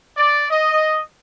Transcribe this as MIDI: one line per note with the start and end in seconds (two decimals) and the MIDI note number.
0.17 0.44 74
0.49 1.01 75